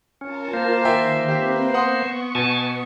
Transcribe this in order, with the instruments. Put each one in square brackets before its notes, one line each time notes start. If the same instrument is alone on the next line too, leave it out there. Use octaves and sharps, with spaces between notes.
[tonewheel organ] C#4 [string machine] F4 A#4 A5
[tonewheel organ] A#3 C5
[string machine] D#3 [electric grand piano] E5 G5 G#5
[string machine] C4 B4 [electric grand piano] G4 E5
[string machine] B3 C#6 [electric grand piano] F#5 C6 D#6
[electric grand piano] B2 [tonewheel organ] G#5 A5